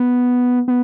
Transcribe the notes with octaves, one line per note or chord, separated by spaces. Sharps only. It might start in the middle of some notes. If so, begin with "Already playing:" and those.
Already playing: B3
B3